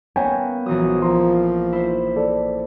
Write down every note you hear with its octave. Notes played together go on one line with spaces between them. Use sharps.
A#3 B3 C#4 C#5 G5 G#5
A#1 E3 F#3 D#6
F3 A#5 C6
E4 C5
A4 D5